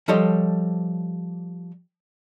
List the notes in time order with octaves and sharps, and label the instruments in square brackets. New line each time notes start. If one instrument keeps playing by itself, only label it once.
[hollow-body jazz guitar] F3 G3 A4 C5 C#5 D#5